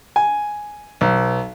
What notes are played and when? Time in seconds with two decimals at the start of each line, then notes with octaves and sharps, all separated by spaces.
0.16 G#5
1.01 B1